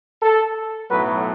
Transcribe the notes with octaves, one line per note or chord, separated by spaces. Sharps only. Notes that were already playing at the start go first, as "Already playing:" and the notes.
A4
B1 A2 F#3 B4